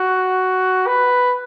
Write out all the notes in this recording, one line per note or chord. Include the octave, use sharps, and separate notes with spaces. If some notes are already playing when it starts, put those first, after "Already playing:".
Already playing: F#4
B4